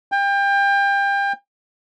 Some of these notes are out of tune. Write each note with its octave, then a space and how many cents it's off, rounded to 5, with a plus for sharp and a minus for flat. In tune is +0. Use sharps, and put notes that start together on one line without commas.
G5 +30